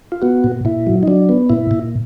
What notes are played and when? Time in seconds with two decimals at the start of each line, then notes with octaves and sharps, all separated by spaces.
0.12 F4
0.22 B3 F#4
0.44 A#2
0.65 A#2 E4
0.87 F#3
1.03 D#4
1.08 F#3 D4
1.29 B3
1.50 A#2 E4
1.71 A#2